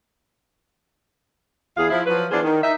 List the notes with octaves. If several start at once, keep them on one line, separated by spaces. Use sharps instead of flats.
E2 G#4 F5
F3 E4
F3 F#3 B4
E3 B3 D4 F4 G#4 C5
D#3
D#4 E5